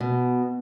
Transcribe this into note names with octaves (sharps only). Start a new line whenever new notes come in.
B2